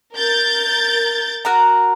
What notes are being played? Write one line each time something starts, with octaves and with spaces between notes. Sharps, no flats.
A#4 G6 A6
F#4 A#4 A#5